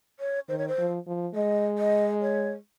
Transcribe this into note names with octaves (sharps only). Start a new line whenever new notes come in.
C#5
D#3 C5
C#5
C5
F3
F3
G#3 D#5
D#5
C#5